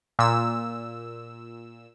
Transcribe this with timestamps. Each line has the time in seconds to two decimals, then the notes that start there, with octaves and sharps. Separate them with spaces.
0.19 A#2 E6